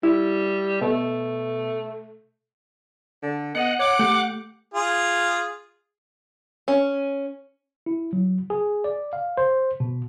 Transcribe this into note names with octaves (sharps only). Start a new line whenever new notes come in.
G3 E4
B2 A3
D3
B3 D#5 F#5
C#5 D6
A3 G4
F4 G#4
C#4
E4
F#3
G#4
D5
F5
C5
B2